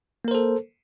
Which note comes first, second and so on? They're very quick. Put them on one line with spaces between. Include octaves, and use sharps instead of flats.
A#3 A#4 C5 A4